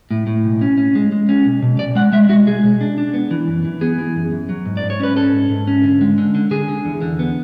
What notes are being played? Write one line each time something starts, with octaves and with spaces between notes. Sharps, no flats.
A2
A2
B1
C#4
C#4
G#3
G#3
C#4
B1
B2
B1 D5
G#3 F#5
G#3 E5
G#3 F#4
B1 G#4
B2
D4
D4
B3
E3
F#2
E3
B3 G#4
E3
F#2
F#2
F#3
G#2
D5
G#2
C#5
C#4 B4
C#4 A4
G#2
G#2
C#4
D3
G#3
D3
D3
D3 G#4
D3
E2
D3
B3